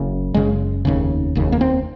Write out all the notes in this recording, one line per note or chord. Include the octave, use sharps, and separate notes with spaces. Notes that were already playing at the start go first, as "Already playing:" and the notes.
Already playing: F#1 F#2 C#3
F#1 F#2 C#3 G#3
F1 D#2 C#3
F1 D#2 C#3
A#3
C4